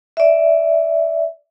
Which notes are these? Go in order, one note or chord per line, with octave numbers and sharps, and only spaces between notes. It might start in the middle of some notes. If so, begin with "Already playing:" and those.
D5 E5